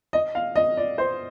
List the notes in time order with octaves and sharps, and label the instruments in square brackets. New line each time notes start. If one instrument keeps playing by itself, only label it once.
[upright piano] D#5
F5
D#5
D5
C5